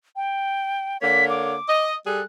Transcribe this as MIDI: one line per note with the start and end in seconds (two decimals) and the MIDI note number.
0.16 0.98 79
1.01 1.54 50
1.01 1.54 58
1.01 1.54 73
1.01 1.25 95
1.30 1.86 86
1.69 1.94 75
2.07 2.21 55
2.07 2.21 68
2.07 2.21 69
2.07 2.25 90